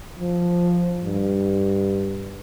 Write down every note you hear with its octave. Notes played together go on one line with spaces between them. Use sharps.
F3
G2